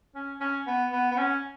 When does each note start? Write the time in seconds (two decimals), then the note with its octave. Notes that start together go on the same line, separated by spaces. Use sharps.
0.15 C#4
0.41 C#4
0.67 B3
0.92 B3
1.11 B3
1.18 C#4